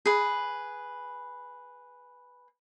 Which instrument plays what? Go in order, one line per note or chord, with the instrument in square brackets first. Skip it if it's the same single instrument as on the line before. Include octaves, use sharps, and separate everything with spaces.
[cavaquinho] G#4 B4